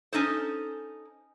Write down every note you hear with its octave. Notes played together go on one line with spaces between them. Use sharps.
C#4 D#4 A4 C5